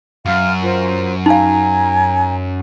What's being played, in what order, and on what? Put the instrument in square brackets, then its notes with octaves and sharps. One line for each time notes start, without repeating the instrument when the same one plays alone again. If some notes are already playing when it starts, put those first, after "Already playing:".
[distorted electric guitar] F#2 [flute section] F5 F6
[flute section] F4 A#4 C5
[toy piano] D#4 F5 [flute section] G#5 A#5